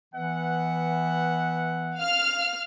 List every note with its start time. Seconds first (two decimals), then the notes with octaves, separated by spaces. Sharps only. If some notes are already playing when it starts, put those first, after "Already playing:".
0.14 E3 B3 E5 F#5
1.96 F5 F6